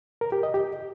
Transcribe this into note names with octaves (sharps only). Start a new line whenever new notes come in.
A#4
G4
D#5
G4